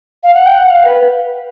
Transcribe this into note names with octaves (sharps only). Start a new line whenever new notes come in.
F5
F#5
G5
F#5
F5
B4